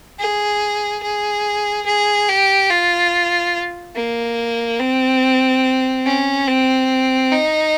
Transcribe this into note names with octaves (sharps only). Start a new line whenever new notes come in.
G#4
G#4
G#4
G4
F4
A#3
C4
C#4
C4
D#4